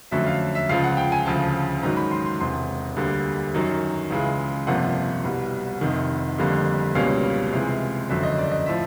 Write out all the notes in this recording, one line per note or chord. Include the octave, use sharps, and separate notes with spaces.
F2 D3 F#3 A3 C#4 E5
F5
E5
C#2 C#3 F3 F5
F#5
G5
G#5
D2 C#3 F3 A5
G#2 D#3 F#3 A#5
B5
C6
C6
E1 E2 C3 C6
D2 D3 G3 A#3
F#2 D#3 F#3
C#2 C#3 E3 G#3
G1 F2 C3 F3 A#3 F#5
C2 B2 G3
F1 F2 C3 D#3
F1 F2 D3 G3 A#3
C#2 B2 G3 A#3 C#4 F5
C#2 C3 E3 G#3
F#1 F2 D3 F#3 E5
D#5
D5
D#5
A2 F3 E5